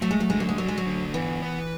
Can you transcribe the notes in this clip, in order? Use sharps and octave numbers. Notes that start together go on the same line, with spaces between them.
F#3 A3
G#3
F#3
D3 G#3
F#3
G#3
F#3 F#4
G#3
F#3
D3
E3 B3
B4